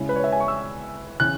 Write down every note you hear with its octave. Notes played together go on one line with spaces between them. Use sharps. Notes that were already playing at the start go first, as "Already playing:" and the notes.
Already playing: C#3 G#3 C#4 E4
B4
C#5
E5
G#5
C#6
E6
C#3 E3 C#4 F#6